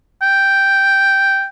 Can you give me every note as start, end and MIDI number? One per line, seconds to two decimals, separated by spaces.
0.22 1.46 79